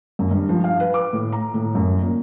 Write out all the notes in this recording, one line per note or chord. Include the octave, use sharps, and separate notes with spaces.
F#2
G2
F3
F5
B4
D6
A2
A#5
A2
F#2
A#2